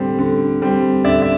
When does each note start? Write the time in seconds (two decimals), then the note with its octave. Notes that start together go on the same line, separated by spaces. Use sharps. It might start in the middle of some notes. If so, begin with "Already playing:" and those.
Already playing: D3 G3 C4
0.19 D3
0.62 G3 C4
1.05 D3 D5 E5
1.22 E5